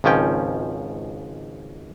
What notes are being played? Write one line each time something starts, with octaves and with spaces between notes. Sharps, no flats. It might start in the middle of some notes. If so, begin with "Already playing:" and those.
G#1 C#2 F3 C#4 G5